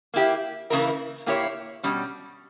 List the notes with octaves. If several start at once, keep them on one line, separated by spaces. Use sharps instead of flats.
A#3 E4 G4
C#3 E3 A#3 E4 A#4
A#2 A#3 E4 G4 C#5
B2 G3 C#4